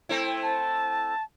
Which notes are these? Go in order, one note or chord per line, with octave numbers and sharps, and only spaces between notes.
A3 C4 E4
A5